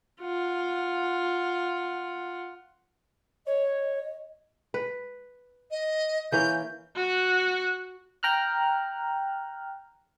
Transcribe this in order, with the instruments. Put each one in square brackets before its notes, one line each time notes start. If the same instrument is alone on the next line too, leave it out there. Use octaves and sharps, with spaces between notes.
[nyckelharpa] F4 F#5
[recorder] C#5 [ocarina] D#5
[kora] B4
[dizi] D#5
[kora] E3 A#3 C#4 [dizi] G6
[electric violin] F#4 F#6
[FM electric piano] G5 A#5 F6 F#6